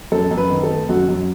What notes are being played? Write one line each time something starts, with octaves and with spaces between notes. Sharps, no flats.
F#2 A4
F#2
B4
D#3
A4
A3
F#2 F#4
F#2